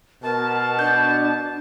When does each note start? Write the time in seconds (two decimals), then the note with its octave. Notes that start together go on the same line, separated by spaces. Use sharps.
0.23 B2 A#4 A5
0.79 D4 G6